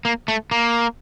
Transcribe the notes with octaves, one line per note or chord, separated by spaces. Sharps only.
A#3
A3
A#3